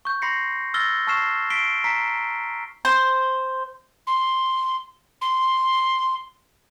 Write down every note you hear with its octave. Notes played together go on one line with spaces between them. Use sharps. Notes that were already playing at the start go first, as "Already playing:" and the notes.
C#6 G6
B5 C6 A#6 C7 C#7
E6 F6 A6 A#6 G7
A5 C#6 E6 F6 C7 E7
B6 C7 D7 G7
A#5 B6 C7
C5
C6
C6